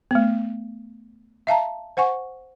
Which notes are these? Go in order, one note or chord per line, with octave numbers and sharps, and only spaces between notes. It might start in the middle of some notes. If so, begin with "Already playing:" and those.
A3 B3
E5 F5 A5 A#5
C5 F#5 G#5 C#6